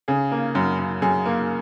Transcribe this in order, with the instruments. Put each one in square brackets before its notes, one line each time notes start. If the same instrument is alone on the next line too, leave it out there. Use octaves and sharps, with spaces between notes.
[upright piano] C#3 G#4
A#3
F#2
F#2
F#2 G#4
A#3